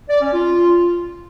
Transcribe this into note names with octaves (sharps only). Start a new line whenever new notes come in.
D5
C#4
F4